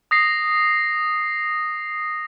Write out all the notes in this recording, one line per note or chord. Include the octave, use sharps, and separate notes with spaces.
D#6 A#6 C7